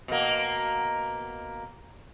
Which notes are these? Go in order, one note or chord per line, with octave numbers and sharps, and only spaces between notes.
B2 A#3